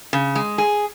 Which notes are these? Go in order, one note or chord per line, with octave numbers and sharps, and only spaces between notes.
C#3
G#3
G#4